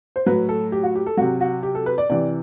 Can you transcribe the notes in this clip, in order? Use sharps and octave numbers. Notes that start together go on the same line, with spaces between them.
C5
A2 F#3 B4
A4
G4
F#4
G4
A4
C3 F#3 F#4
F#4
G4
A4
B4
D5
C3 E3 D5